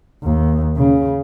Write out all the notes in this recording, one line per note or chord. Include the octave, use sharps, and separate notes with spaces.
D#2
C#3